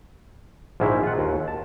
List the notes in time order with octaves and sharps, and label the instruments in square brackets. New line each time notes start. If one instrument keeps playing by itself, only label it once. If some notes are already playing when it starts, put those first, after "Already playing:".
[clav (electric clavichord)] A#1 G#2 D#3 G#3 E4
F4 F#5
D#2
A5